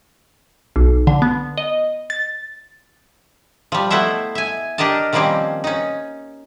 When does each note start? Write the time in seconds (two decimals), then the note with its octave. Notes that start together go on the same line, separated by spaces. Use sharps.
0.76 B1
1.07 D3
1.22 B3
1.58 D#5
2.10 A6
3.72 F3 G3
3.90 A3 B3 E4 C5 E5
4.35 E5 G#5
4.78 D4 G4 A#4 D#5 A5
5.13 D#3 F3 G3 A#3 C4 C#4
5.64 C#4 D#4